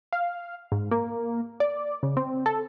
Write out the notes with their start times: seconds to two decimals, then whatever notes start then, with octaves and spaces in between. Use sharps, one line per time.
0.13 F5
0.72 G#2
0.91 A#3
1.60 D5
2.03 C#3
2.17 C4
2.46 A4